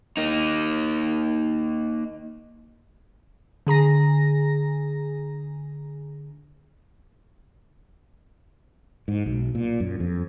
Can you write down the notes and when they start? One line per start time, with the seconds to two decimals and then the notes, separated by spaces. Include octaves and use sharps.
0.17 A#3 D#4
3.67 D3 G#4 A#5 A#6
9.08 G#2
9.26 B1
9.55 A#2
9.80 F#2
10.00 F2